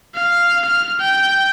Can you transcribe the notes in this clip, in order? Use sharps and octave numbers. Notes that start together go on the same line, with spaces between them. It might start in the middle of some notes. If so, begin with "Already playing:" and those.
F5
F6
G5